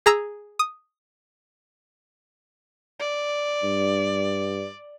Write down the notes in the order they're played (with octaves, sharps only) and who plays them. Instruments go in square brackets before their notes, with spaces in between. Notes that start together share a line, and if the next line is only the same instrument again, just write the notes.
[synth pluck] G#4 A#5 E6
D#6
[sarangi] D5
[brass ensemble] G2